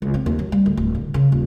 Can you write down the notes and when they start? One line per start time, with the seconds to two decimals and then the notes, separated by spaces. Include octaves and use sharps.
0.02 C#2
0.14 C4
0.26 D#2
0.39 F#3
0.52 G3
0.66 D2
0.77 D1
0.95 D3
1.14 C#3
1.32 D#1